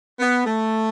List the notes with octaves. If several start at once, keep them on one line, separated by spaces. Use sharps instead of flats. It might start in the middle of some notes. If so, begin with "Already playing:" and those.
B3
A3